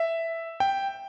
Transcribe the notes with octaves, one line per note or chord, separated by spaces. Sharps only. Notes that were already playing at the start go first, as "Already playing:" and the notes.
Already playing: E5
G5